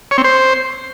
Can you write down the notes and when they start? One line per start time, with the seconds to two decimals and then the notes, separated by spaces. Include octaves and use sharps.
0.11 C#5
0.18 C4
0.24 C5